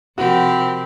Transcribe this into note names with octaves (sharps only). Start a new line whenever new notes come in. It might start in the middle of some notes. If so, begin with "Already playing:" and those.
C3 F3 C4 F#4 G4 A#4 B5